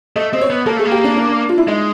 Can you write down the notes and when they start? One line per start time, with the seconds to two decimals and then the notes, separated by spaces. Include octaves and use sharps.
0.16 A3 D#5
0.33 C4 D#5
0.41 C#5
0.50 B3
0.66 A#3 A4
0.77 A3 G#4
0.85 A#3
0.92 G4
1.04 D4
1.17 D4
1.49 F4
1.58 E4
1.68 G#3 D#4